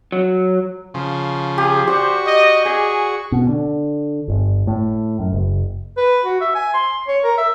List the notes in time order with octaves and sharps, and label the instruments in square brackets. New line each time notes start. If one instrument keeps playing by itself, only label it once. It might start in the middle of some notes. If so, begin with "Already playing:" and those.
[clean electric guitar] F#3
[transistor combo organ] C#3 F3
[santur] G4 [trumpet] G#4
[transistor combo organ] F#4 [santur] G4 D5 F#5 [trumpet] C5
[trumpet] D#5
[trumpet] G#4 [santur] G#5
[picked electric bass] B2
D3
G1
A2
F#2
F#1
[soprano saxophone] B4
F#4
E5
G#5
C6
C#5
A#4
E5